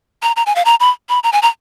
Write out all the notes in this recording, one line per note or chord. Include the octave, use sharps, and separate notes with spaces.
A#5
A#5
G#5
F5
A#5
B5
B5
A#5
G#5
A#5